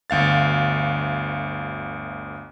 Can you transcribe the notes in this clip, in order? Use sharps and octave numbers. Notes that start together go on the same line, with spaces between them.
G1 D2 F5 A6